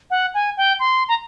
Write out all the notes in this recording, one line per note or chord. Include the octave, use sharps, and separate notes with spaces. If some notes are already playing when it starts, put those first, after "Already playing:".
F#5
G#5
G5
C6
A#5